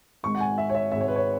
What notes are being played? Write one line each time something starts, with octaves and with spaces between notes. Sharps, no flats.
G#1 G#2 G#3 C#6
F#5
G#5
E5
C#5
E5
G#1 G#2 G#3 E5
C#5
B4
C#5